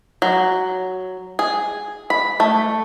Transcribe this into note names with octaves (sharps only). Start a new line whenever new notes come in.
F#3
G#4
B5
A3